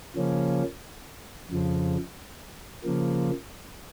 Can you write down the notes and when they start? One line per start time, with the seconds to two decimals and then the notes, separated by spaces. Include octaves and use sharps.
0.16 C#3 F3 A#3 C#4
1.50 F2 C#3 F3
2.84 C#3 F3 A#3